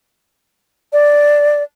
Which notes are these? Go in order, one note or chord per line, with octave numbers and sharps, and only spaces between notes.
D5